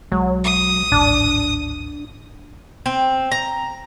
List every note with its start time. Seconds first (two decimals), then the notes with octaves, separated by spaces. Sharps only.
0.12 B1 F#3 G#3
0.44 D#6
0.92 D1 G#1 D4
2.86 C4
3.32 A#5